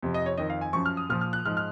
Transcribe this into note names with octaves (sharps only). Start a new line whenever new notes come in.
F2 C3 F3
D#5
C#5
F2 D#3 D#5
F5
G#5
F#2 F3 C#6
F6
D#6
A#2 F3 F6
F6
F#6
G#2 F3 F6
F6